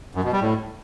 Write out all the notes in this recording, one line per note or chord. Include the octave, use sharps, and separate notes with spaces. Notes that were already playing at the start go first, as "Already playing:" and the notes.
F#2
B2
G3
A2